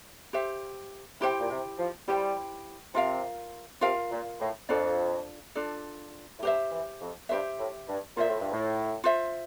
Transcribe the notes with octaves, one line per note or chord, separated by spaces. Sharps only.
G4 C5 E5
C3 E4 G4 C5 G5
A#2
C3
F3
G3 E4 G4 C5 G5
C3 F4 A#4 F5
C3 F4 A#4 F5
A#2
A2
F2 D4 F4 A4 D5
D4 F4 A4 D5
A2
G2 G4 C5 E5
E3
F2
G2 G4 C5 E5
A2
G2
A#2 F4 C5 E5
A2
G2
A2
F4 C5 E5